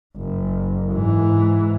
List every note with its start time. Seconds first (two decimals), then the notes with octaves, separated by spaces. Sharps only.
0.17 F#1
0.93 G#2 E3